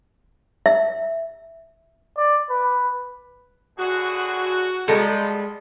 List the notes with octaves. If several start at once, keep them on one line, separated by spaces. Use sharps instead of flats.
E5
D5
B4
A1 D3 F#4 G#4
B2 F3 G3 G#3 A4 A#5